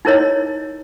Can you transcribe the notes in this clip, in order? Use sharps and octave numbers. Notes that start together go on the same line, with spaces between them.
D#4 E4 A#4 C#5 D#5